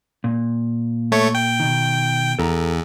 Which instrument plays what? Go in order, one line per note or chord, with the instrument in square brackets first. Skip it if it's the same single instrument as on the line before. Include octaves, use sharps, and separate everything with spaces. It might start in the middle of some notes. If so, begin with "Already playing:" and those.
[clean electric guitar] A#2
[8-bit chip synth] A3 C#5
G5
[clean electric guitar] B2 D#3
[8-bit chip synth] E2 [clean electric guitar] A4 A#5